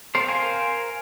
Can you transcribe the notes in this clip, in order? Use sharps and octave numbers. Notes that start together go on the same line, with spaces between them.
C4 A4 A#4 C5
A#4 C5 F5 G#5